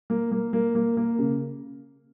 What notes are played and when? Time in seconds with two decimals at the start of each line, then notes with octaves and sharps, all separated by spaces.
0.10 A#3
0.32 A#3
0.53 A#3
0.75 A#3
0.97 A#3
1.19 C#3